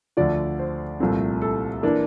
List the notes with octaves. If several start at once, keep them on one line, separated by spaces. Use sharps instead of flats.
D2 D3 F3 D5
C5
C2 A#2 F3 A3 C4
A4
E3 A#3 D4